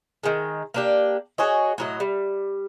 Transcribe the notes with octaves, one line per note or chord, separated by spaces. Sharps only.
D#3 G#3
A#3 D4 G4
F#4 G#4 C#5 D#5
A2 F#3 D#5
G3